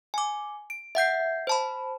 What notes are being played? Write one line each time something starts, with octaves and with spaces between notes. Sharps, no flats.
G#5 D6
D7
E5 F#5 G6 C7
C5 A5 B5